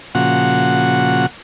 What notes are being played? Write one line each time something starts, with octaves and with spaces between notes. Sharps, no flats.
A#2 C#3 F3 F#4 F#5